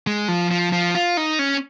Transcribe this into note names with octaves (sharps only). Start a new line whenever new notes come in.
G#3
F3
F3
F3
F4
D#4
C#4